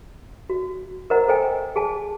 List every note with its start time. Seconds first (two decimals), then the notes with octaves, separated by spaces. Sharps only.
0.50 F#4
1.10 A#4 C5 D#5 F#5 A#5
1.28 A4 C5 D#5 G5 G#5
1.76 G#4 G#5 A5